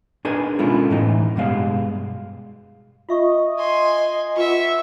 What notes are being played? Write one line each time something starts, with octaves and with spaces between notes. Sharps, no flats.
D4 D#4 G#4 A#4 B4 G#5
B2 G#3 C#4 E4 F4 A4
A2 E3 D#4
G2 B2 G#3 F5
F4 D#5 E5 C#6
G#5 C6
F4 B4 E5 F#5 C#6